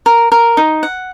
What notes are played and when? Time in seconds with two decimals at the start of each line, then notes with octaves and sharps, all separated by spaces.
0.06 A#4
0.32 A#4
0.57 D#4
0.83 F#5